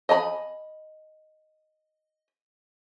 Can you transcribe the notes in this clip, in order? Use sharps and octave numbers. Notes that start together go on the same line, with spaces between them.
D#5 G#5 A#5 B5